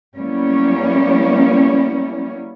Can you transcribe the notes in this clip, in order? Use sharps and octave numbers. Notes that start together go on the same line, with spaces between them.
F#3 G3 A#3 B3 C#4 E4